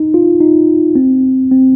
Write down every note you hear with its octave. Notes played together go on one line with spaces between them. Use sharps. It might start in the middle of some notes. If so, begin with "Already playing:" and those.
Already playing: D#4
F4
D#4
C4
C4